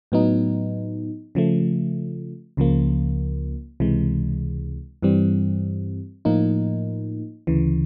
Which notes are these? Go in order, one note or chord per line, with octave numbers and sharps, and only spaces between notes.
A2 F#3 B3 D#4
C#3 F3 A3
C#2 C#3 F3 A#3
C#2 C3 E3 G#3
G2 E3 G3 C4
A2 F3 A#3 D#4
D2 C#3 E3